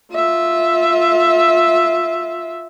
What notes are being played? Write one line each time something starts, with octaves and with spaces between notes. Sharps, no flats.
F4 E5